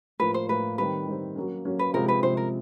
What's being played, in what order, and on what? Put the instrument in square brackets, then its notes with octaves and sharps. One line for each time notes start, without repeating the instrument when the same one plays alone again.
[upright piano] A2 F3 A#3 [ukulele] B4
[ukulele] C5
[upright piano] A2 F3 A#3 [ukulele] B4
[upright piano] D#3 G3 C4 [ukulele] B4
[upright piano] D#3 G3 C4
F#3 A#3 C#4
F#3 A#3 C#4
[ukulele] B4
[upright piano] C3 F3 G#3 C4 [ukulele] A#4
[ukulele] B4
[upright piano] C3 F3 G#3 C4 [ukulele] C5
[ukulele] A#4